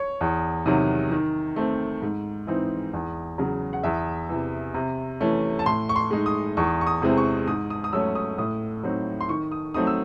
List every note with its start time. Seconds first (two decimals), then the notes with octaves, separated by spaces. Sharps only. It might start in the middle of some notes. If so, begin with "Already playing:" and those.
Already playing: C#5
0.21 E2
0.66 C3 D#3 F#3
1.11 D#3
1.56 A3 C4
2.02 G#2
2.47 E3 C4 D#4
2.93 E2
3.38 C#3 F#3
3.73 F#5
3.84 E2 E5
4.29 C3 E3
4.74 C3
5.20 E3 A3 C#4
5.59 A5
5.66 A2 C6
5.89 C#6
5.96 C6
6.11 G#3 D#4
6.26 D#6
6.57 E2 C#6
6.81 C#6
6.87 D#6
7.02 C3 E3 G#3 C4
7.17 C#6
7.47 G#2 D#6
7.70 D#6
7.84 D#6
7.93 F#3 A3 C#4 E6
8.15 D#6
8.38 A2 D#6
8.83 F#3 C4 D#4
9.21 C6
9.29 D#3 C#6
9.52 D#6
9.74 F#3 A3 C4 D#4 D#6
9.87 E6